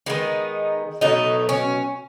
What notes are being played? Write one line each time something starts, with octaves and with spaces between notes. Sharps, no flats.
D#3 G#3 B3 D#4
B2 F#3 A3 D#4
C#4